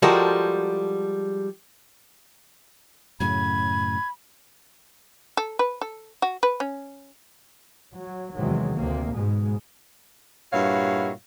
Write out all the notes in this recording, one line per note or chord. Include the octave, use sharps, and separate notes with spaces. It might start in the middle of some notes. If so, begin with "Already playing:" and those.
F3 G3 G#3 F#4 A4 A#4
F#2 A2 C#3 B5 G#6
A4
B4
A4
F#4
B4
C#4
F#3
E2 C3 D#3 F#3 G#3
D2 C3 A#3
G#2 B2 G#3
G2 A#2 E4 F#4 C#5 F5